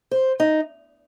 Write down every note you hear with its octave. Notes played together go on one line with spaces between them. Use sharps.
C5
D#4